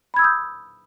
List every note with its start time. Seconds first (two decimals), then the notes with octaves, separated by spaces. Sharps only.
0.14 B5
0.16 G#6
0.19 E6
0.22 D#6
0.24 G6